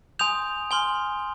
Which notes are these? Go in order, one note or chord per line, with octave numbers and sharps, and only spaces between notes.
G#5 C6 D#6 G6 F7
G#5 C6 F6 G7